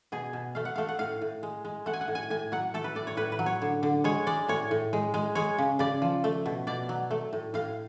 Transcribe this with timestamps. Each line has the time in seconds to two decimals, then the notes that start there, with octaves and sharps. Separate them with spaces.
0.12 B2 G#4
0.33 B2
0.55 A3 F5
0.65 F#5
0.75 A3 F5
0.88 F#5
0.99 A2 F5
1.22 A2
1.43 G#3
1.65 G#3
1.86 A3 F#5
1.93 G#5
2.01 F#5
2.08 A2
2.15 G#5
2.30 A2 G#5
2.52 F#3 F#5
2.74 A3 A4
2.84 B4
2.95 A2 D5
3.07 C#5
3.17 A2 B4
3.32 B4
3.39 F#3
3.46 C#5
3.61 D3
3.83 D3
4.04 G#3 C#5
4.27 G#3 D5
4.48 A2 C#5
4.71 A2
4.93 G#3
5.14 G#3
5.35 G#3 C#5
5.58 C#3
5.79 C#3 D5
6.02 F3
6.24 A3
6.46 B2
6.67 B2 D5
6.89 F#3
7.11 A3
7.33 A2
7.54 A2 F5